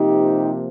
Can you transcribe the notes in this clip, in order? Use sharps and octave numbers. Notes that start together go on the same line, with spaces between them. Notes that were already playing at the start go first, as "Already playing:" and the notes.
Already playing: C3 F3 A#3 D#4 G4